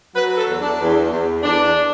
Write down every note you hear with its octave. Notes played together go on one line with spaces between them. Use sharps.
F#3 B4
A4
E2
D4
E2
E2
E2 D4